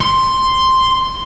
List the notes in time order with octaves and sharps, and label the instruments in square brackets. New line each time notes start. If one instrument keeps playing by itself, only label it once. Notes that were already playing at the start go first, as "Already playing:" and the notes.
[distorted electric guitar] C6